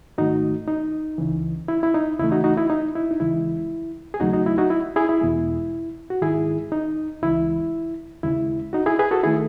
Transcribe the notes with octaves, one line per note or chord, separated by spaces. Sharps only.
G#2 D#3 A3 D#4 F#4
D#4
C#2 C#3 E3
E4
E4
D#4
D#2 C#3 E3 A3 E4
D#4 F#4
D#4 F#4
E4
D#4
E4
D#4
D#2 C#3 E3 G#3 E4
G#4
D#2 C#3 F#3 A3 D#4 F#4
D#4 F#4
E4
D#4 F#4
E4
E4 G#4
E4
E2 B2 G#3
F#4
G#2 D#3 G#3 E4 G#4
D#4
C#2 C#3 E3 G#3 E4
D#2 C#3 G#3 E4
D#4 F#4
E4 G#4
G#4 B4
F#4 A4
D#3 A3 E4 G#4